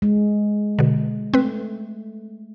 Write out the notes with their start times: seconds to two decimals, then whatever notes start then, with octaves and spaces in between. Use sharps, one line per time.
0.02 G#3
0.79 B2 D3
1.34 A3 C4 B4